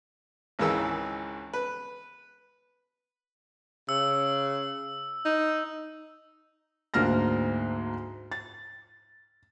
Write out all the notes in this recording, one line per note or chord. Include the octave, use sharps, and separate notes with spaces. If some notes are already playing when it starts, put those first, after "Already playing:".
G#1 C#2 C#3 E3 A#4 E6
B4
C#3 E6
D#4
D2 G#2 A#3 D4 F6 A#6
A6